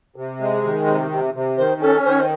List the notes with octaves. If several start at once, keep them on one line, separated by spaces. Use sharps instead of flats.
C3
G#3
G#4
D#3
C3
C3
C3
D#3 C5
C#4 A4
D#3 C5
C#5
C5